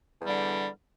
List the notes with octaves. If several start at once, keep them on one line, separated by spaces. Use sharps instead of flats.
E2 D3 G3